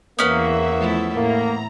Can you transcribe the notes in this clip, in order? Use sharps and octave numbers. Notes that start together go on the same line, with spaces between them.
E2 A#3 B3 C#4 B4 E5
F3 A3 E4
A2 A#3 A#5